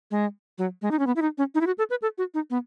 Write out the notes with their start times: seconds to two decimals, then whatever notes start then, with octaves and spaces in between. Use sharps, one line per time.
0.11 G#3
0.58 F#3
0.82 G#3
0.91 D#4
0.99 C#4
1.07 B3
1.16 E4
1.22 D#4
1.38 C#4
1.55 D#4
1.61 E4
1.67 F#4
1.78 A4
1.90 B4
2.02 A4
2.18 F#4
2.34 D#4
2.50 B3